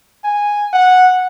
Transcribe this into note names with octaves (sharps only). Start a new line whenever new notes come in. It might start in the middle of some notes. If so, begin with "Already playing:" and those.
G#5
F#5